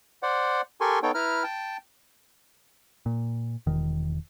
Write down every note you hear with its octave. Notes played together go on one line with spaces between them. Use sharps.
C5 D5 F#5
G4 A4 A#4 G#5 C6 C#6
B3 D#4 A4 C#5 G5
E4 B4 A#5 F6
G5 A5
A#2
E1 D#3